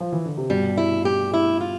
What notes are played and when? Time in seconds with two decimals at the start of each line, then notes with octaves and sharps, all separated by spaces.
0.00 F3
0.12 E3
0.25 D3
0.37 C3
0.50 G2 B2 G3
0.77 E4
1.05 G4
1.34 E4
1.60 F4